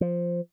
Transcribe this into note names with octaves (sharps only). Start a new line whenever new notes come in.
F3